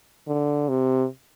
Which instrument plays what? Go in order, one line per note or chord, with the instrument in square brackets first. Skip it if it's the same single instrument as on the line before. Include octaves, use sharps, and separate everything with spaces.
[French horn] D3
C3